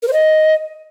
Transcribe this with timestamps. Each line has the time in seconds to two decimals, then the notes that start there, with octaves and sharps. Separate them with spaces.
0.03 A#4
0.08 C5
0.13 D#5